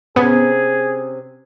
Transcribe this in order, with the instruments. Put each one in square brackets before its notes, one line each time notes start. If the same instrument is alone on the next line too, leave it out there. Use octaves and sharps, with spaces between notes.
[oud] C3 C#4 [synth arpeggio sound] B3 [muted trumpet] G#4